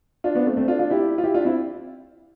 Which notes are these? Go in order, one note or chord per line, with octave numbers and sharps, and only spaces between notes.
D4 F4
B3 D4
A3 C4
A3 C4
D4 F4
D4 F4
E4 G4
F4
E4 G4
D4 F4
C4 E4